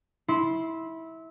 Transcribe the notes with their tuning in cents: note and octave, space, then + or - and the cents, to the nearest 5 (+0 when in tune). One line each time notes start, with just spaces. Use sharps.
E4 -20 C6 +0